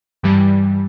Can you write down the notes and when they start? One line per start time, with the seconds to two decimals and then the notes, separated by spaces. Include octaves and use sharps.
0.23 G2 E3 G3